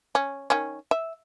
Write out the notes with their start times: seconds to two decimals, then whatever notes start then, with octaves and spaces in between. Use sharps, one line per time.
0.15 C#4
0.50 D#3 C#4
0.91 E5